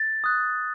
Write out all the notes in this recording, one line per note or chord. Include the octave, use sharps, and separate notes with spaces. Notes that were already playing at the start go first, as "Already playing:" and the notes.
Already playing: A6
D#6 F#6